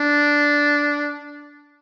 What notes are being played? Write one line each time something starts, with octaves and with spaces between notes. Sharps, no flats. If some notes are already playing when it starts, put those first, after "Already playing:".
Already playing: D4